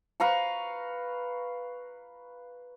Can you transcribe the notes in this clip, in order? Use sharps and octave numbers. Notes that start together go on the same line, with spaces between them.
B4 F5 A#5 C#6